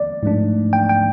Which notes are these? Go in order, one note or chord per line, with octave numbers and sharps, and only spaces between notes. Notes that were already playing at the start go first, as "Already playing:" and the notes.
Already playing: D5
G#2 F3 A3 D4
G5
G5